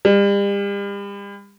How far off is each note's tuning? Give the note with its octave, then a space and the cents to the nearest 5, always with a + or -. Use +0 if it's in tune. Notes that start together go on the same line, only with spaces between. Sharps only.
G3 +40